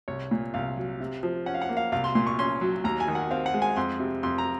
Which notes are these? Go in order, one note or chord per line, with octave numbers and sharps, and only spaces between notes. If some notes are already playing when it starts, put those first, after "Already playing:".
C2 C#5
A#2
C2 F5
F#3
C3
F3
C#4 F#5
F5
F#5
A#3
F5
C2 F5
C6
A#2 C6
C#6
C#4 C6
F#3
D#2 A#5
G#5
D#3
F#5
C4 F5
F#5
G#3
G#5
F2 C6
C3
F2 C6
A#5